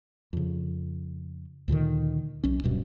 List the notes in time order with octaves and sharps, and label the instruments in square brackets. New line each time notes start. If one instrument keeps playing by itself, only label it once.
[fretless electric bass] F2 C#3
D2 A#2 D3 D#3
B1 C#4
D1 G2 B2